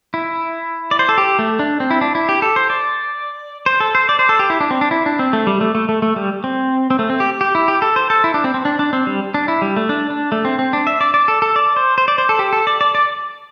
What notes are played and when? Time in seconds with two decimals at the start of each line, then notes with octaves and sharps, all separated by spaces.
0.14 E4
0.91 D5
0.99 C5
1.09 A4
1.18 G4
1.39 A3
1.59 D4
1.80 C4
1.91 E4
2.01 D4
2.15 E4
2.29 G4
2.42 A4
2.56 C5
2.70 D5
3.66 C5
3.80 A4
3.95 C5
4.09 D5
4.19 C5
4.29 A4
4.39 G4
4.50 E4
4.61 D4
4.71 C4
4.81 D4
4.91 E4
5.06 D4
5.19 C4
5.33 A3
5.47 G3
5.61 A3
5.75 A3
5.89 A3
6.02 A3
6.16 G3
6.44 C4
6.90 C4
6.99 A3
7.10 C4
7.20 G4
7.41 G4
7.55 E4
7.68 G4
7.82 A4
7.96 C5
8.10 A4
8.24 E4
8.34 D4
8.44 C4
8.54 C4
8.65 D4
8.79 D4
8.93 C4
9.07 G3
9.34 D4
9.48 E4
9.62 G3
9.77 A3
9.89 D4
10.10 D4
10.32 A3
10.45 C4
10.59 C4
10.73 D4
10.87 E5
11.01 D5
11.14 D5
11.28 A4
11.42 A4
11.56 D5
11.76 C5
11.98 C5
12.08 D5
12.18 C5
12.29 A4
12.39 G4
12.53 A4
12.67 D5
12.81 D5
12.95 D5